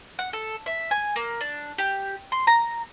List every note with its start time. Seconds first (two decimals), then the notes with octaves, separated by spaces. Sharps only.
0.19 F#5
0.33 A4
0.66 E5
0.91 G#5
1.16 A#3
1.41 D4
1.78 G4
2.32 C6
2.47 A#5